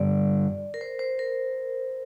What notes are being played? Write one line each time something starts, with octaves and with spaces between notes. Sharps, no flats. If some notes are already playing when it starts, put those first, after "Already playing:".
Already playing: G2 D3 G3 D5
A#4
C5
C5
A#4